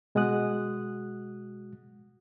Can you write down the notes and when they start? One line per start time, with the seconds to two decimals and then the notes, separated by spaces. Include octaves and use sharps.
0.15 B2 G#3 F#4 F#5 D#6 F#6